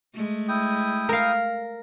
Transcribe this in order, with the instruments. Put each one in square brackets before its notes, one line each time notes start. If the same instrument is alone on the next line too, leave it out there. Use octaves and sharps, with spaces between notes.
[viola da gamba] G#3 A3
[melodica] E4 G5 D#6
[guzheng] A#4 F5